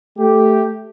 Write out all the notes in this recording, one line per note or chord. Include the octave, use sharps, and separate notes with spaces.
A3 G4